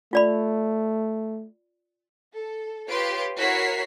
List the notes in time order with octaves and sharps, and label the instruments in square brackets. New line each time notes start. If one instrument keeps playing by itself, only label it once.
[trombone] A3 [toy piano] F4 D5 B5
[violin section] A4
F4 G4 B4 C#5 C6 D7
E4 F#4 A#4 C#5 B6 C7